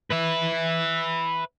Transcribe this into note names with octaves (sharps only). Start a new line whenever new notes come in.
B4 E5